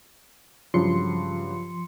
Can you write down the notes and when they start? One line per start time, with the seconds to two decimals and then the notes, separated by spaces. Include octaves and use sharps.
0.74 G2 C#3 F3 F#3 C6 C#7